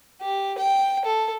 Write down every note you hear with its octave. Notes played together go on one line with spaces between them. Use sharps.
G4
G5
A4